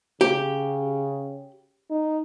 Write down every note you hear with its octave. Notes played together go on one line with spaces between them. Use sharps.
C#3 G4
D#4